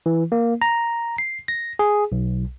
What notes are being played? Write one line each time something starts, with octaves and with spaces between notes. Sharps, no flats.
E3
A#3
A#5
C7
A#6
G#4
B1